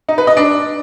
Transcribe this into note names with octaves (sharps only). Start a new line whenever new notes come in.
D#4
B4
D#5
D4